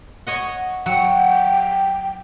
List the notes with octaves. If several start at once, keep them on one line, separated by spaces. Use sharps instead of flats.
C#5 D#5 F#5
F#3 F#5 G5